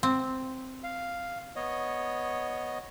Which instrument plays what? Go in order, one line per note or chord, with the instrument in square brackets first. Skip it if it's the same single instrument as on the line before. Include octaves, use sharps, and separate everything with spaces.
[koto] C4
[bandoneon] F5
B3 C#5 D#5